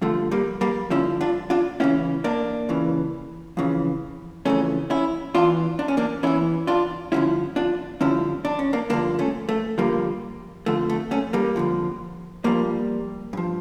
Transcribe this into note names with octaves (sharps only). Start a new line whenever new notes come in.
G2 D3 F3 A3
G3 A#3
G3 A#3
G2 D3 F3 C#4 E4
D4 F4
D4 F4
C#2 C#3 E3 C#4 E4
A#3 D4
C#2 C#3 E3
F2 C#3 E3
F2 C#3 E3 A3 C#4
C#4 E4
E2 E3 D4 F4
D4
C#4
A#3 D4
E2 E3 C#4 E4
D4 F4
G2 D3 F3 C#4 E4
D4 F4
G2 D3 F3 C#4 E4
D4
C#4
A#3 D4
G2 D3 F3 A#3 D4
A3 C#4
A3
G2 D3 F3 G3 A#3
F2 D3 F3 A3
A3
A3 C#4
G3 A#3
F2 D3 F3
G2 F3 G3 A#3
G2 F3